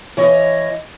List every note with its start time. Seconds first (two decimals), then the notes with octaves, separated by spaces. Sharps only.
0.17 E3 C#5 D#5